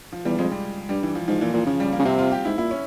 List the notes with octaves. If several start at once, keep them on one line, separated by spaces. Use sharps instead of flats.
F3
E2 G3
F2 G#3
G3
G2 G3
E3
F3
G#2 F3
A#2 E3
A#2 F3
C#3 F3
G3
A#3
C#3
C3 C4
F4
G4
G#2 E4
A#2 E4
C#4